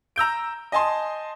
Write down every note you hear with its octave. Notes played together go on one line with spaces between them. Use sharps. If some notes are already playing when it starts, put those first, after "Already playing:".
A#5 E6 G6 D7
D#5 G#5 A5 C6 D#6